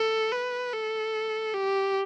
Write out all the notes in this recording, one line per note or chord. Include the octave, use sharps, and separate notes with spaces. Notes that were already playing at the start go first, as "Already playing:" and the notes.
Already playing: A4
B4
A4
G4